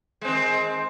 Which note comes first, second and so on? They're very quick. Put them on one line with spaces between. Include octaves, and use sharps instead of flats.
G#3 C4 D#3